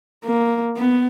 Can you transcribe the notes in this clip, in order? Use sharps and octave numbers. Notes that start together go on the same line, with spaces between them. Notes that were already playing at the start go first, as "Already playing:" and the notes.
A#3
B3